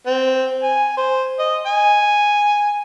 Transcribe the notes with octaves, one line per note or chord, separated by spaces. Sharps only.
C4
G#5
C5
D#5
G#5